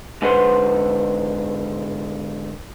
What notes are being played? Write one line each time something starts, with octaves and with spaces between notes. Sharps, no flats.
G#2 D3 B4 C5 F#5 C6